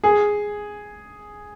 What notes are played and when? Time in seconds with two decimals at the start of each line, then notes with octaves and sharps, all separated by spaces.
0.04 G#4